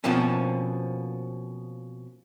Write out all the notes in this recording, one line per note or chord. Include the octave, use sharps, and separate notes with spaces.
B2 F3 A#3 C4 C#4